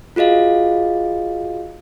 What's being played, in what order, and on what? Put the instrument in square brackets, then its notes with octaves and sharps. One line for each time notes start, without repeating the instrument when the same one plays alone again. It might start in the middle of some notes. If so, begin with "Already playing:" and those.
[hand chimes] F4 F#4 G#4 D#5 F5